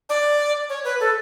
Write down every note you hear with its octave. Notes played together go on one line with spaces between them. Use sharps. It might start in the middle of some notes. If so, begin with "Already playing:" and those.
D5
C#5
B4
A4